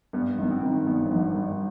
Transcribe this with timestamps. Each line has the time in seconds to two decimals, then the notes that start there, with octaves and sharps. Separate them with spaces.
0.13 G2 B3
0.38 G#1
0.43 B3
0.51 C4
0.63 D#3
0.87 G2 B3
1.06 F#3
1.10 G#1 F3
1.34 G2 G3